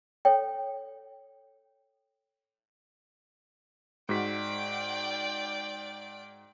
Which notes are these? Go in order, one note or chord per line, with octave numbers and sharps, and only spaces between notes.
A4 C#5 G5
G#2 F#4 D5 G5 B6